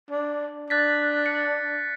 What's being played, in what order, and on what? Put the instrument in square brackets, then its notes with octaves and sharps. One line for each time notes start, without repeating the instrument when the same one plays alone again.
[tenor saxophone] D4
[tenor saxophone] D4 [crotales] F#6 A6 B6
[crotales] C#7